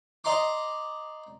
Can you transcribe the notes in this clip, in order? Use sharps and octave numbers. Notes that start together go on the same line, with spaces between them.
D5 D#5 A#5 C6 D6